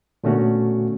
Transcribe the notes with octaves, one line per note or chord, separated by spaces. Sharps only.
A#2 D3 A3 B3 C#4 F#4